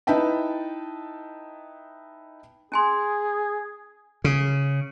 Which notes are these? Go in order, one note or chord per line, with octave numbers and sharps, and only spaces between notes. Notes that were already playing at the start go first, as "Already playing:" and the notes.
D#4 E4 B4 E5 G5 A5
C#4 G#4 G#5 C6
C#3